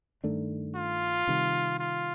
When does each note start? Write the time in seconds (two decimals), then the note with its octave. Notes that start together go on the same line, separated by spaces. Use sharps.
0.24 G2 D#3 A3 D4
0.75 F4
1.28 C3 D#3 G3
1.79 F4